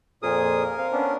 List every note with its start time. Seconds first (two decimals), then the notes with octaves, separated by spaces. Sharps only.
0.22 F2 A#2 G#4 A#4 D#6
0.78 C4 F5
0.92 B3 C#4 D4